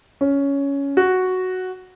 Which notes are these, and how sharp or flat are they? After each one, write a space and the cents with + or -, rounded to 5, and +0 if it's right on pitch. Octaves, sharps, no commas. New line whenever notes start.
C#4 +10
F#4 +0